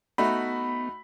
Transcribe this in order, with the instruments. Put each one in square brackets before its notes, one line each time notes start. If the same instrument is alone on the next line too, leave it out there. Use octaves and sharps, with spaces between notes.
[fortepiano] A3 D#4 F#4 [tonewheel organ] B3 [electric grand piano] B5